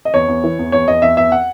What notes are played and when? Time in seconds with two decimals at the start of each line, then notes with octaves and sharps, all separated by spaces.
0.05 D#5
0.14 E2 C#5
0.28 E2
0.44 E3
0.59 E2
0.72 E2 C#5
0.88 E2 D#5
1.02 E2 E5
1.17 E2 E5
1.32 F#5